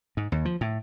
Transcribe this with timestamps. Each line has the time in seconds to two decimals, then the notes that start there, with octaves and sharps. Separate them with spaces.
0.17 G#2
0.32 D#2
0.45 F3
0.61 A2